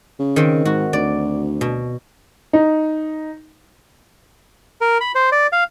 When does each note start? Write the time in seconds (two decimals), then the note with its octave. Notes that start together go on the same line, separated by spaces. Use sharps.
0.19 C#3
0.36 D#3 C4
0.65 G#2 F#4
0.93 D2 D5
1.61 B2
2.53 D#4
4.81 A#4
5.00 B5
5.15 C5
5.32 D5
5.52 F5